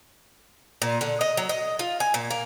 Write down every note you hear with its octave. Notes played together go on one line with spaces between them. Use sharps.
A#2
D3
D#5
F#3
D#5
F4
G#5
A#2
A#3